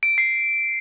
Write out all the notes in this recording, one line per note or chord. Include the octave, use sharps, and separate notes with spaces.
D7
C7